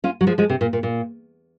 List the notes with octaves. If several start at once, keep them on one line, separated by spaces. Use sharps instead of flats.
C#4 F4
F#3
F3 G#3
F3 G#3
C3
A#2
A#2
A#2